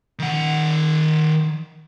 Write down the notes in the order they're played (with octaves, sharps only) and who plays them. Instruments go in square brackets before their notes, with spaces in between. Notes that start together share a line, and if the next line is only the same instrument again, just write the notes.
[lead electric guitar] D#3 F#5